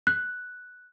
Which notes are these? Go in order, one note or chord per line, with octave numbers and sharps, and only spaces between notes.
F#6